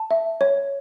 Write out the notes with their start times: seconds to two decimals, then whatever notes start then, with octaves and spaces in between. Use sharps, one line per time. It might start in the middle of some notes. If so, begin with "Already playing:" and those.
Already playing: A5
0.11 E5
0.41 C#5